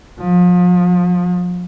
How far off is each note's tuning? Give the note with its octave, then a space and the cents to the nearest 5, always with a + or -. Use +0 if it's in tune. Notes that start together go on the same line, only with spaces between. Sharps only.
F3 +35